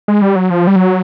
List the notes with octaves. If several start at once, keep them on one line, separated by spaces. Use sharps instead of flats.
G#3
G3
F#3
F3
G3
F#3